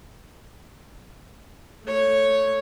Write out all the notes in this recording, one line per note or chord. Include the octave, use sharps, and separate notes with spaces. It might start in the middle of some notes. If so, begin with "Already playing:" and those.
A3 C#5